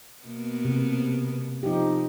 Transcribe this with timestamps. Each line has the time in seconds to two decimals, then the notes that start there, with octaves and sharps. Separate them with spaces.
0.25 B2 A#3 B3
0.65 C3
1.63 F3 D#4 G4